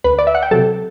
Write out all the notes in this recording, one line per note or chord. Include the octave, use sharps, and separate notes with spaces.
D2 B4 B5
D5
E5
F#5
G5
C3 F#3 A4 A5